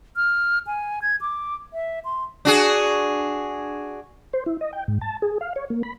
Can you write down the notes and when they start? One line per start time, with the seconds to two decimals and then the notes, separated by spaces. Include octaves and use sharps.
0.16 F6
0.67 G#5
1.02 G#6
1.21 D6
1.73 E5
2.05 C6
2.45 D4 F#4 G#4
4.33 C5
4.46 E4
4.61 D#5
4.73 G5
4.88 G#2
5.01 A5
5.22 G#4
5.41 F5
5.56 C#5
5.70 A#3
5.83 B5